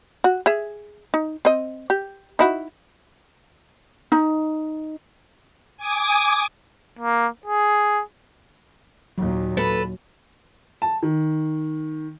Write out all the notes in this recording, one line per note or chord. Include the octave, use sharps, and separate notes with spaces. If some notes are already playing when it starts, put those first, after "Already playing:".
F#4
G#4 E5
D#4
C4 D#5
G4
D#4 E4 F#4
D#4
G#5 D6 D#6
A#3
G#4
D#2 A#2 F#3
A4 B4
A5
D#3